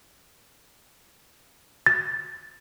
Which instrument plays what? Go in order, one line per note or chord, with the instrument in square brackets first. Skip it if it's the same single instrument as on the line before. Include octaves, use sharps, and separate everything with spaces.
[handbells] A6